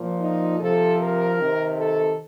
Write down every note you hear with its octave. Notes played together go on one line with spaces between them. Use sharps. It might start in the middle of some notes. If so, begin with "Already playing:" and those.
Already playing: A#2 F3
D#4
C3 F3 A4
A#4
C3 D#3
A4